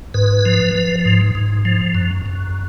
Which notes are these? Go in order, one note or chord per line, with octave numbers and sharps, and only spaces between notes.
G#2 B4
F3
F3
G#2
G#2
F3
F#2
F#2